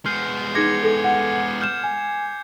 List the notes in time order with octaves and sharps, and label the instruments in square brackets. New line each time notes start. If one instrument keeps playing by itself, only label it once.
[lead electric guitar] G#3 B3 [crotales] F6 G6 C7
[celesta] D#4 G#4 A#6 [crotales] D6 G#6 C#7
[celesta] A4
F#5
[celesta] F6 E7 [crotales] G6
[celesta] G#5